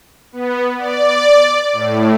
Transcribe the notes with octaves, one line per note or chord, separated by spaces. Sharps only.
B3
D5
A2